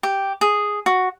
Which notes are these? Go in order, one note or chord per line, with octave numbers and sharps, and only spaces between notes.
G4
G#4
F#4